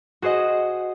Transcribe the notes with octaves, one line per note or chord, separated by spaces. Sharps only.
F#4 G#4 C5 D#5 F#5